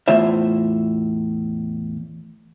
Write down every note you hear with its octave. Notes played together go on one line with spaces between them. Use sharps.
E2 A2 F4 C5 E5